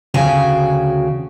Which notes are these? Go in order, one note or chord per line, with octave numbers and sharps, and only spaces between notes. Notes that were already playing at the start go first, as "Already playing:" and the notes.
D2 C#3 F#4 G5 G#5